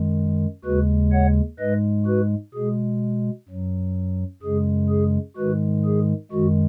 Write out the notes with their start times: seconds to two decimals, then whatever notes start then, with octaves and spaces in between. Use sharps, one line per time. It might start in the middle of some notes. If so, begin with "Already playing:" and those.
Already playing: F#2 D#3 G#3
0.65 D#2 C#3 G#3 F#4 B4
1.13 C#5 F#5
1.59 G#2 G#3 B4 D#5
2.06 F#4 B4
2.54 B2 G#3 G#4
3.49 F#2 F#3
4.42 F#2 C#3 G#3 G#4
4.89 G#4
5.37 G#2 D#3 G#3 F#4 B4
5.85 G#4
6.31 F#2 D#3 G#3 F#4